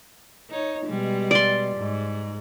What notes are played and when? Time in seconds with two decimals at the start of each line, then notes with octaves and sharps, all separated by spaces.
0.50 D#4 C#5
0.86 B2 G3 G#3
1.31 D5 C6
1.77 G#2